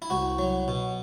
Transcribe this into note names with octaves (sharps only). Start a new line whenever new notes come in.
E4
C2 F#4
F#3
B2